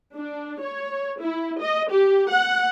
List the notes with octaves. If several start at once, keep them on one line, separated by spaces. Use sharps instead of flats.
D4
C#5
E4
D#5
G4
F#5